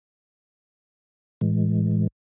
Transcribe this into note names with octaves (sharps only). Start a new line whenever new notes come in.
A2 E3 G#3